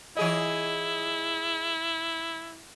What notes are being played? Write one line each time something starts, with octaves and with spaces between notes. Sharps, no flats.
E3 E4 G#4 D#5